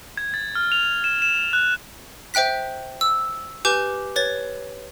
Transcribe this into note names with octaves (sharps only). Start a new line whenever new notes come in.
G#6
A6
F6
F7
E7
E7
F#6
C5 E5 G5 F#6 B6
E6
G4 B4 G#5 D6 G6
B4 C#5 A6